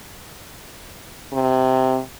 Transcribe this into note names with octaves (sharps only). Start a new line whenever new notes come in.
C3